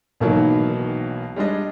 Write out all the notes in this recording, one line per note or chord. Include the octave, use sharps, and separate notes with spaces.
B1 B2 D#3 E3 F#3 A#3
G3 G#3 D4 D#5